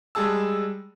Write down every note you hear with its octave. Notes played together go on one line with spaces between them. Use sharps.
G3 G#3 G#4 A5 E6